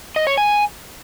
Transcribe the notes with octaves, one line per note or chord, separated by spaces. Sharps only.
D#5
C#5
G#5